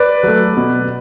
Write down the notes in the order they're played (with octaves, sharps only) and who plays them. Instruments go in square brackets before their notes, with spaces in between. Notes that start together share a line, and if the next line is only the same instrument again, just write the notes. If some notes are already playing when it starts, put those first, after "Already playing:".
Already playing: [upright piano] B4 D5
F#3 A3
B2